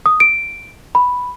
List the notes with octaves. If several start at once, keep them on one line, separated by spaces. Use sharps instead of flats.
D#6
D7
B5